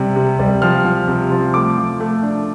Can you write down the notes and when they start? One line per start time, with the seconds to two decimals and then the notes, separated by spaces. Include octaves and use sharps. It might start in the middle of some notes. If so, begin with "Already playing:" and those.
Already playing: C3 G3
0.16 C3
0.39 G3
0.62 F3 F6
0.84 F3
1.08 C3
1.31 F3
1.54 A3 D6
1.77 F3
2.00 A3
2.23 D4